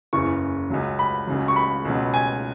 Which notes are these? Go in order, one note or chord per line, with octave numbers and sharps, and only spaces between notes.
F#1 E2 C#3 E3 C#6
C#2 C#3 F#3
B5
C#2 C#3 F#3
C#6
B5
C#2 B2 F#3
G#5